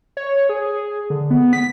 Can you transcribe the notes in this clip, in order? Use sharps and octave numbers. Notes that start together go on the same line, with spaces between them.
C#5
G#4
D3
B3
B6